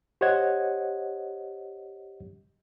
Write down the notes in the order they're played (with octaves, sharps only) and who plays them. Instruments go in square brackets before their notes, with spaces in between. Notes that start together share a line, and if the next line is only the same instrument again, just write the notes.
[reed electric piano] G4 C5 C#5 D#5 F#5 G#6